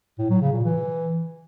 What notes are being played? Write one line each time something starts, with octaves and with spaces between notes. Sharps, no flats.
A2
F#3
C#3
A#2
E3